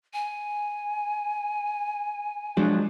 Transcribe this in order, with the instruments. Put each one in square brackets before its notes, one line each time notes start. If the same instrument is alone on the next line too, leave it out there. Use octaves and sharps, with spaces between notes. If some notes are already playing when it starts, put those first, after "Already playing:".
[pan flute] G#5
[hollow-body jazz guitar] F3 F#3 D4 [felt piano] G#3